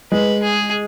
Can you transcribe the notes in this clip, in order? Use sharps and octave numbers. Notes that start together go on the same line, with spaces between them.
G#3 B4
G#4